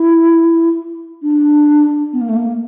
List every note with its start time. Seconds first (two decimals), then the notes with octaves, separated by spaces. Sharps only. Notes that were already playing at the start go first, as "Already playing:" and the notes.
Already playing: E4
1.22 D4
2.13 B3
2.21 A#3
2.29 A3
2.36 A#3